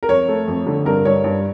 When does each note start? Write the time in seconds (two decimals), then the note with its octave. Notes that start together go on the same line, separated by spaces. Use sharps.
0.03 A#4
0.09 F2 C#5
0.28 A3
0.48 F2
0.67 D3
0.85 G2 A#4
1.05 G2 C#5
1.24 G2